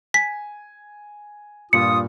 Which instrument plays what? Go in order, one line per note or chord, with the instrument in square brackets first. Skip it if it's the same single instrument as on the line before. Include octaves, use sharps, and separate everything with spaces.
[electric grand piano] G#5 [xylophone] B6
[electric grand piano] G2 A#2 [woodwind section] F4 D#6 [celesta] C#7